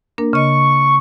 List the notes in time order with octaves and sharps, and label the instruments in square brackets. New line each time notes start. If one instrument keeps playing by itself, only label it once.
[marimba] A#3 D4 A#4
[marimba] C#3 D#5 [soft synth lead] C#6